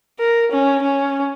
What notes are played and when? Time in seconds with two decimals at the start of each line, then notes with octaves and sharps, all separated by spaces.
0.19 A#4
0.52 C#4
0.82 C#4